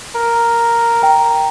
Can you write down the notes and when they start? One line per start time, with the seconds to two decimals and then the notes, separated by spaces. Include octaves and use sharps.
0.15 A#4
1.02 G5 A#5